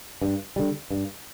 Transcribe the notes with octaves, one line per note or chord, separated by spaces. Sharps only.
G2
D3 G3
G2